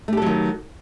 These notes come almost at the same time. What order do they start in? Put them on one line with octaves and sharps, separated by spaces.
A3 G4 A4 F#3 D#3